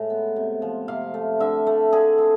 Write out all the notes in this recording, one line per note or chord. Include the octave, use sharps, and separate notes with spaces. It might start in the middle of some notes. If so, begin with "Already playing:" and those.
Already playing: A2 G#3
B3
C3
F3
C3 F5
A3
D3 E5
A3
D3 G#4
C4